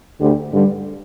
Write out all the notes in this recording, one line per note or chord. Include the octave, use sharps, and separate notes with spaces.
D2 D3 A3 G4
G2 D3 G3